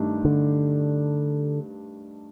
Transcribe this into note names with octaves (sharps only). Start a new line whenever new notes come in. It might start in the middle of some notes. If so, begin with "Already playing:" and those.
Already playing: G2 D#3 A3 D4 G4
D3